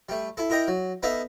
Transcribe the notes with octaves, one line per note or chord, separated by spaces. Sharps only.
G3 A3
E4 A4
E4 A#4 D#5 G5 A#5
F#3
B3 D#4 A4 E5 F5